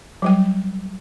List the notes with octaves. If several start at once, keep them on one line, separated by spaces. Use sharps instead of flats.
F#3 G3 G5